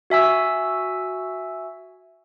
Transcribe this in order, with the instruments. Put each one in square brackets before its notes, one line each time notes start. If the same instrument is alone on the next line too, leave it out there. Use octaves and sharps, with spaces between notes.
[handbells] F#4 E5 G#5 E6